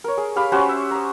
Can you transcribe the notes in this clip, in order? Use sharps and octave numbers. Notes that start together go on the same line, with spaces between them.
A#4 C#5
G#4
G4 F5 B5
C#4 F#4 G4 C5
E5
A#5 D#6